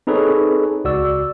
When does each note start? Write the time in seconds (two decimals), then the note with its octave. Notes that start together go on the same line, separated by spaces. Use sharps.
0.07 C4 D#4 G#4 A4 B4 C#5
0.85 C#2 F#4 D5 E6